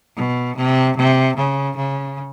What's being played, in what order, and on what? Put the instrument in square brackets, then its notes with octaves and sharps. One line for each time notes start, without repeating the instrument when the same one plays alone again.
[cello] B2
C3
C3
C#3
C#3